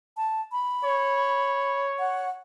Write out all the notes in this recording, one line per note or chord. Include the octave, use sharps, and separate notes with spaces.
A5
B5
C#5
F#5